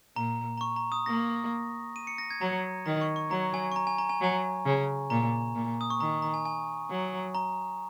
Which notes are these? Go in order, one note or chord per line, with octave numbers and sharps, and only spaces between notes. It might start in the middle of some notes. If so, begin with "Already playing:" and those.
A#2 A#5
A#5
C#6
A#5
D#6
A#3 A#6
D#7
C#7
A#6
G#6
F#3 A#5
D#3 A#5
C#6
C#6
F#3 A#5
G#5
C#6
A#5
G#5
A#5
G#5
F#3 G#5
C#3
A#2 A#5
A#2
D#6
C#6
D#3 A#5
A#5
G#5
G#5
F#3
A#5